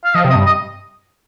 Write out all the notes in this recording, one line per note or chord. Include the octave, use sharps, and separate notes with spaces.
F5
F3 D#5
C3
D#5
G2
D#5